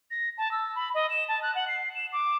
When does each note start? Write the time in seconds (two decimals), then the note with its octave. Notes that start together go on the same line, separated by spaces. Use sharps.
0.11 A#6
0.38 A5
0.51 E6
0.75 B5
0.94 D#5
1.10 E7
1.28 A5
1.42 F#6
1.55 F#5
1.68 C7
1.95 E7
2.12 D6